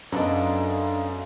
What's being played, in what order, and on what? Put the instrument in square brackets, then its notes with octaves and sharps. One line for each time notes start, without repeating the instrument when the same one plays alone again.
[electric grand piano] F#2 [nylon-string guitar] B3 D4 D#4 [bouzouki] A4 B4 D#5 [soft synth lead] F5